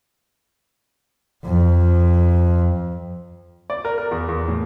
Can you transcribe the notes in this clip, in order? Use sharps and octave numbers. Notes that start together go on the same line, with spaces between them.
F2
D5
A#4
A#4
E2
E2
A2